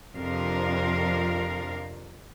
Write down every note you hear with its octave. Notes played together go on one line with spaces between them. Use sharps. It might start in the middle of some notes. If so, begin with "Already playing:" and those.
F2 C3 F3 D4 A#4 F5